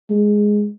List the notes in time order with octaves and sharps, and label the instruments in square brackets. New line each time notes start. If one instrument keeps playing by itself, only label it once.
[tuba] G#3